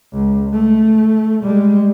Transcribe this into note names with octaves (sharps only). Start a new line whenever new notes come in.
C#2
A3
G3 G#3